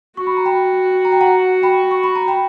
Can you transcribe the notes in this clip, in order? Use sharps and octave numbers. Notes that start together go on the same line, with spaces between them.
F#4 C#6
B5
A#5
G5 B5
A#5
G5
F#5 A#5
G5 B5
C#6
B5
A#5
G5 B5